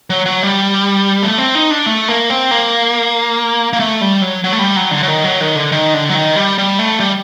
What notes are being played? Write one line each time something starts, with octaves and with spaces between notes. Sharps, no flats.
F#3
F#3
G3
A3
C4
D#4
D4
A3
A#3
C4
A#3
A#3
A3
G3
F#3
F#3
A3
G3
F#3
D3
F#3
D#3
F#3
D#3
D3
D#3
D3
F#3
D#3
G3
G3
A3
G3